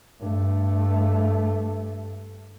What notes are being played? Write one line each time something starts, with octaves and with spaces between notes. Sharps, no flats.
G2 A3